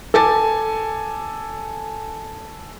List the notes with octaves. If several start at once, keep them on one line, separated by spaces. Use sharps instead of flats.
A4 G#5 D6 A6